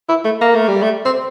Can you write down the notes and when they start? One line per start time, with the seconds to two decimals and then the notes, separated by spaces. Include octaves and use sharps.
0.09 E4
0.25 A3
0.41 A#3
0.55 A3
0.68 G3
0.82 A3
1.05 C4